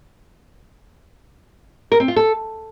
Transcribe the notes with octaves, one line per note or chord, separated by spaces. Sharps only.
A#4
C4
F4
A4